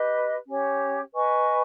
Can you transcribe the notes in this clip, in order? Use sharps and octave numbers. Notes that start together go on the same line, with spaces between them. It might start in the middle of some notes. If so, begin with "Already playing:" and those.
Already playing: G4 B4 D#5
C#4 G4 C#5
B4 D#5 G#5 C#6